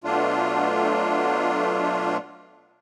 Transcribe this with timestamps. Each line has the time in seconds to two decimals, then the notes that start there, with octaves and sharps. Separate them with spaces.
0.04 B2 F#3 A3 D4 F4